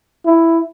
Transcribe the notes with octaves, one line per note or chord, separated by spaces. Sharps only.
E4